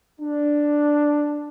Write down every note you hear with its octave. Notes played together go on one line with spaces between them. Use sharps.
D4